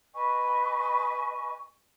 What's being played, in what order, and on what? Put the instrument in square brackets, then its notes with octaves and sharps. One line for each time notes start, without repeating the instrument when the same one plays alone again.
[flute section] B4 D#5 G#5 C#6